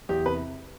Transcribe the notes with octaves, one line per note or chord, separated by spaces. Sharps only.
E2 G4
C3 B4